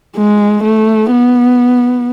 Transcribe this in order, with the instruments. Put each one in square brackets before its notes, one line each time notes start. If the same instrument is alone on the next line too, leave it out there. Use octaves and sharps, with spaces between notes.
[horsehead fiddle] G#3
A3
B3